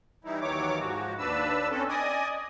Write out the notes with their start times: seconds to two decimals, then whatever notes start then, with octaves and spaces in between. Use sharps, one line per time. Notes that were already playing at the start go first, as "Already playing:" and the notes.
0.24 E3 G3 D#4 E4
0.41 D#2 D#3 E3 F#3 C#5 D6
0.79 G#2 F3 F#4
1.18 D#2 D4 B4 E6
1.71 C4 C#4 A4
1.89 D5 D#5 G#5 D#6